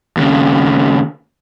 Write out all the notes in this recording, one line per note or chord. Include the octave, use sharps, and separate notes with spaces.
D#2 C#3